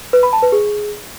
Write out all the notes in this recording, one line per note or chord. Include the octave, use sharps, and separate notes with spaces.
B4
B5
A5
B4
G#4